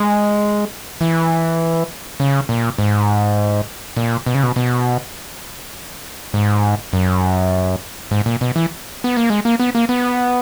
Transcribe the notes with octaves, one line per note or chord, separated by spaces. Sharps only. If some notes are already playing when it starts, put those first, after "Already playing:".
Already playing: G#3
E3
C#3
A#2
G#2
A#2
B2
C#3
B2
B2
G#2
F#2
G#2
A#2
B2
E3
B3
A#3
G#3
A#3
B3
A#3
B3